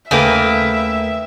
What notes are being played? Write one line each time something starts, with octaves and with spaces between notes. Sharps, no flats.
D#2 C#3 A3 A#3 B4 E5 G5